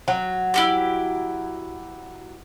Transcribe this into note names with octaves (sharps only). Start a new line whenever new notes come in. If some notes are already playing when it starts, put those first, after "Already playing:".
F#3
E4 F#4 G4